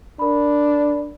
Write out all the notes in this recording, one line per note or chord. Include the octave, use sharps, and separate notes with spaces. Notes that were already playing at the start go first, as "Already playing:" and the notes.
D4 A#4 B5